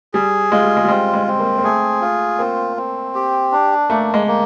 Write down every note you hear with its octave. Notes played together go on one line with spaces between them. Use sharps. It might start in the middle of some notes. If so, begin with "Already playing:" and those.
G3 G#4
G#3 F4
G3
G#3
G3
G#3 C4
G#3
C4
A#3
A#3
A3 G#4
F4
A#3 C4
C4
G4
D4
A3 A#3
G#3
A#3